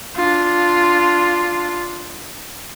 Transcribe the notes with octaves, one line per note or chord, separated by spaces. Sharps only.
D4 F4